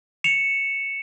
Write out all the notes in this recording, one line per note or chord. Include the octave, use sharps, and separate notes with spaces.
C#7 E7 F7